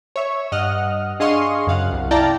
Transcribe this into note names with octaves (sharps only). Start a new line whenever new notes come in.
C#5 E5
G2 D#5 F#5 F6
D4 G#4 D#5 F5 C6 C#6
F#2 C#3 F5 F#5
C2
E4 D5 F5 G5 A5 A#5